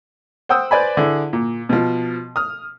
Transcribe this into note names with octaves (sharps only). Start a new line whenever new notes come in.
C5 F#5 G5 D#6 E6
B4 C5 D5 G#5 B5
D3 E4 G#4
A#2
B2 F3
D#6 F6